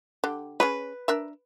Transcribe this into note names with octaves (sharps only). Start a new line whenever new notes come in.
D3 G4
C#4 G#4 B4 C#5
D4 A#4 E5